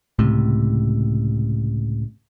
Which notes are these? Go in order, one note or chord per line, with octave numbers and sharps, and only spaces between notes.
C#2 A2 C3